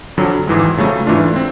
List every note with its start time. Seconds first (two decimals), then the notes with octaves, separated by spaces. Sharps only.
0.17 F2 D3 F#3
0.47 G#1 G#2 E3 G#3
0.77 F2 C#3 F#3 A3
1.06 G#2 E3 A3 D4 F4
1.36 C4